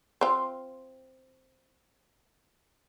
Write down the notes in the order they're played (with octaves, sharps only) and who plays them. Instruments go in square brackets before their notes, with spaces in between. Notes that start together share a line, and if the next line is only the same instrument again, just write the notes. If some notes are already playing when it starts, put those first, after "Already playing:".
[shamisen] C4 F4